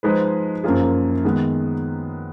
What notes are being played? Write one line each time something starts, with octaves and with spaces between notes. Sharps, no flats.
F3 G#3 D#4 G#4 B4
F#2 F3 A#3 F4 G#4
D#3 G#3 B3